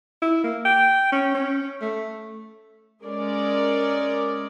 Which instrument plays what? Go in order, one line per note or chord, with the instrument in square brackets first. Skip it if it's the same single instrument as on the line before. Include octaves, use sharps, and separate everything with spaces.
[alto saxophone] E4
A#3
G5
C#4
C#4
A3
[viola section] G#3 C#4 G#4 A#4 D5